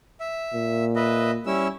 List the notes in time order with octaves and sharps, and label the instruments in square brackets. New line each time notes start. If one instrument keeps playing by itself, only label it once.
[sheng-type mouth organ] E5
[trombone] A#2
[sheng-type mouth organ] B4 D#5 E5
[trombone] G3 [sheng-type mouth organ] C#4 E4 E6